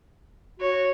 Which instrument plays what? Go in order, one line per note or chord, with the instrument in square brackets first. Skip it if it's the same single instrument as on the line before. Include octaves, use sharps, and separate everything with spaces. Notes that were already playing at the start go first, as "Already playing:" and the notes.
[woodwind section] F#4 [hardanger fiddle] C#5